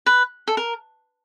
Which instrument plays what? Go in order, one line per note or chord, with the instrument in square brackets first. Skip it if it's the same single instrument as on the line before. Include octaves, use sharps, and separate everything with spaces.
[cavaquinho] B4
A4
A#4